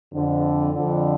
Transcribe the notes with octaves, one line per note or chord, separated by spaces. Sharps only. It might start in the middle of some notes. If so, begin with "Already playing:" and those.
F2 D3
F2 D3